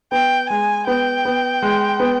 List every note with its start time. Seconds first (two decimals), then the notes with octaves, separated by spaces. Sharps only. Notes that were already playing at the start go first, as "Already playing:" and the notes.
0.12 B3 G5
0.50 G#3 G#5
0.87 B3 G5
1.25 B3
1.62 G#3
2.00 B3